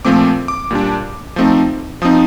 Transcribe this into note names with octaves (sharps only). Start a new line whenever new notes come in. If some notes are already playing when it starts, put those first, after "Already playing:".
A#2 F3 A3 C4 D6
D6
A#2 G3 D4
F3 A3 C4 D#4
F3 C4 D#4 D#6